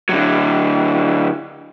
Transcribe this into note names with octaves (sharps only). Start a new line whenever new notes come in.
D3 F#3